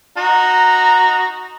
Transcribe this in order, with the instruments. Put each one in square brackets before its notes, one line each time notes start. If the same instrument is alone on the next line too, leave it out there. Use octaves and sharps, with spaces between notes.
[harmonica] D#4 F#4 A#5